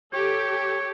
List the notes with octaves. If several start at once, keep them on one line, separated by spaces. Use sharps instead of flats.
G4 A4 C#5